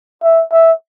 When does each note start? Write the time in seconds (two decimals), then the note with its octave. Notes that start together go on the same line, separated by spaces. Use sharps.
0.23 E5
0.52 E5